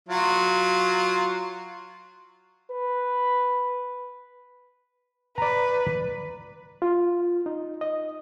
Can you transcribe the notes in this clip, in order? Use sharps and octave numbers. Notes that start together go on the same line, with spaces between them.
F#3 F4
B4
B4 D5 A#5
F4
D#4
D#5